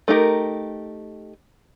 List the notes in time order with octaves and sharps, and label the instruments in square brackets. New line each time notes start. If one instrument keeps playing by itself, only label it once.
[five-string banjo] A3 D#4 G4 A#4